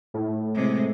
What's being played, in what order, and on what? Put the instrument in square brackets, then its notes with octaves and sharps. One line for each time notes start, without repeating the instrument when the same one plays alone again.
[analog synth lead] A2
[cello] C3 G#3